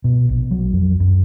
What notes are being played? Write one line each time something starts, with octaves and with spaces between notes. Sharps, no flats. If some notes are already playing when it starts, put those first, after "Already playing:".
B2
A#1
F#3
F2
F#2